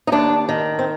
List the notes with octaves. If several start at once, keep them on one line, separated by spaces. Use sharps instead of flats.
D#4
D#2 D4
D#3
C4